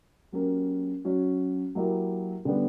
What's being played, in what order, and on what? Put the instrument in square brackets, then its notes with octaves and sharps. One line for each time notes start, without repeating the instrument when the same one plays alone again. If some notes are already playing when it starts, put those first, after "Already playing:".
[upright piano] F#3 A#3 C#4 G4 A#4
F#3 C#4 F#4 C#5
F#3 A#3 E4 G4 A#4
D3 G3 B3